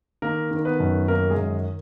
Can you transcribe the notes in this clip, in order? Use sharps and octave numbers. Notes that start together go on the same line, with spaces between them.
D#3 A#3 A#4
D#3
A#4
B3 B4
F#2
D#3 A#3 A#4
G#3 G#4
F#2